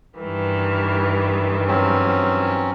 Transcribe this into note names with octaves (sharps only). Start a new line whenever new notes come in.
G2 D#3 E3
F#3 C4 C#4